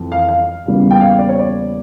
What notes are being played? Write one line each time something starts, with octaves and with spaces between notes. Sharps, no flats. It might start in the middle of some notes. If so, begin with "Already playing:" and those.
Already playing: F2 E3
F5
F5
E2 C#3 G3 A#3
G5
F5
D5
C#5
D5